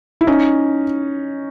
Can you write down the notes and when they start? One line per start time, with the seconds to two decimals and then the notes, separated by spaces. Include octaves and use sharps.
0.21 E4
0.27 C#4 D#4